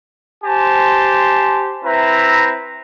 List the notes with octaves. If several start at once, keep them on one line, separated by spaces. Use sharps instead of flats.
G4 C5 G#5 A5 C6
C4 E4 B4 E5 A#5